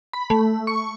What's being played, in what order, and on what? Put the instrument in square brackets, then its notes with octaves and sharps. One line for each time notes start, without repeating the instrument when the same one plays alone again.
[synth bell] B5
A3
C#6